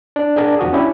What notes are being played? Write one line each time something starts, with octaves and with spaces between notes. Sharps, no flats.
D4 D5
D4 G#4 A#4
E2 F3 F#4 D#6
C#4 D4 E4 G4